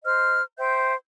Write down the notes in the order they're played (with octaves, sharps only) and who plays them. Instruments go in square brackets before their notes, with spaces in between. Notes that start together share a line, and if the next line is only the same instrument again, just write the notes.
[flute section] C5 D#5 F6
C5 E5 G5 G6